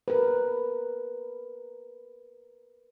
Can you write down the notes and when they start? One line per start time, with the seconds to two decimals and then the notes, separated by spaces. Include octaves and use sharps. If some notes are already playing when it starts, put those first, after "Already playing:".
0.08 A#4 B4